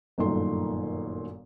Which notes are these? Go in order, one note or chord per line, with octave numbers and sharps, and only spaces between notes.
G1 F#2 A#2 D#3 A4 C6